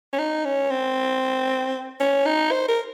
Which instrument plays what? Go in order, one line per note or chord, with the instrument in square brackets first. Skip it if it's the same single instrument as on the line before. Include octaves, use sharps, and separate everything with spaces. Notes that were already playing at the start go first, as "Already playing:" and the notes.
[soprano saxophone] C#4
D#4
C#4
C4
C#4
D#4
C5
A#4